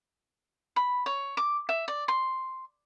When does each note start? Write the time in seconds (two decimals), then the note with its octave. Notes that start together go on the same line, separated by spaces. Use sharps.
0.76 B5
1.06 C#5
1.37 D6
1.69 E5
1.88 D5
2.08 C6